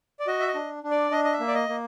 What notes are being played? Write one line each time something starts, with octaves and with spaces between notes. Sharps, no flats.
D5
F#4 D#5
E5
D#5
D4
D4
D5
D4 D#5
D#5
E5
A#3
D5
D#5
A#3